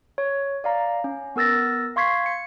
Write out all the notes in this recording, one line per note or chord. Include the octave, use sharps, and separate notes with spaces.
C#5
D5 F5 A#5
C#4
B3 A#4 E6 A6 A#6
F5 C6 C#6 G#6 B6 C7
C#7